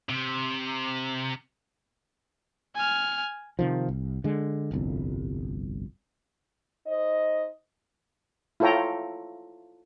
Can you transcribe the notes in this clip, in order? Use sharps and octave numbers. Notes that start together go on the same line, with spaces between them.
C3
G#5 F6
C3 D#3 F3
C2
D3 G#3
G1 C2 F2
D#4 C5 D#5
E4 F4 A4 C#5 G5 A#5